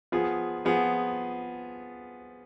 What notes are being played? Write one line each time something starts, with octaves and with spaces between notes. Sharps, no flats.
F3 B3 F4 G#4
F3 B3 F4 G#4